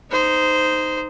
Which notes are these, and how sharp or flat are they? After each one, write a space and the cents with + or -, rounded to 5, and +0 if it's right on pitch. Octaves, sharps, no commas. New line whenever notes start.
D#4 +0 C5 -15